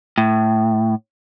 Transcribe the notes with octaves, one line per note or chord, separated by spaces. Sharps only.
A2